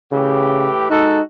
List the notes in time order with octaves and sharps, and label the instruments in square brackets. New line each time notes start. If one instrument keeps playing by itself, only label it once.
[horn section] A2 E3 G4 [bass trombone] C#3
[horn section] G#3 F#4 A4 [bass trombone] D#4